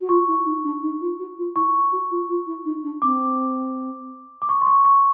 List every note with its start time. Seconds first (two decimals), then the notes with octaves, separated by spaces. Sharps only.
0.01 F#4
0.09 F4 C#6
0.28 E4
0.46 D#4
0.64 D4
0.82 D#4
1.01 F4
1.19 F#4
1.37 F4
1.55 E4 C#6
1.92 F#4
2.11 F4
2.29 F4
2.47 E4
2.65 D#4
2.84 D4
3.02 C4 D6
4.42 D6
4.49 C#6
4.62 C6
4.67 C#6
4.85 C#6